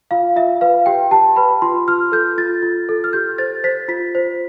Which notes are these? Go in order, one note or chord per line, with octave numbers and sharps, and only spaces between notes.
F4 F5
F4 E5
B4 F5
G4 G5
G4 A5
B4 B5
F4 C6
F4 F6
A4 G6
F4 A6
F4
A4
F6
G4 G6
C5 A6
C5 B6
F4 B6
C5